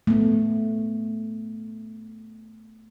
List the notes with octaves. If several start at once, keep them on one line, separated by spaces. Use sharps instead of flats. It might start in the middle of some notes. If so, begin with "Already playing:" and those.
A3 B3